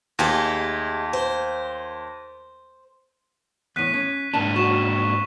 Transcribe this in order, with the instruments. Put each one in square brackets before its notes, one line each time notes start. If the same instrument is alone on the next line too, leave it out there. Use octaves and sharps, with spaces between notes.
[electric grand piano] D#2 [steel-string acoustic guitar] G#3 A3 G4
[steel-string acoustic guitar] C5
[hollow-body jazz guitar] E2 A2 [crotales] F#6 B6 D#7
[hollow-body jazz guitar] C#4
[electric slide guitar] G#2 A#3 D4 [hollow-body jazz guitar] A5
[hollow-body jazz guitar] F#4 [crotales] C#6 E7